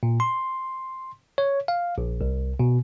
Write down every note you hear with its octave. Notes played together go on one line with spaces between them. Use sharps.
A#2
C6
C#5
F5
A#1
C2
B2